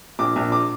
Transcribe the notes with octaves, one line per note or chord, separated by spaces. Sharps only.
A#1 D6
A#1
D6